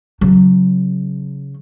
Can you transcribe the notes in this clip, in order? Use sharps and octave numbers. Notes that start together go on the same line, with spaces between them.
C#3 F#3